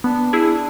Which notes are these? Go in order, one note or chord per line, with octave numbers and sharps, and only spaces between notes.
B3 D4
E4 G#4